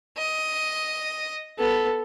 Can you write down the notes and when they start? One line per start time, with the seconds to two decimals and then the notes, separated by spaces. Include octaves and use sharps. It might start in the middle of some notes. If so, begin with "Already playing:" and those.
0.17 D#5
1.59 B3 A4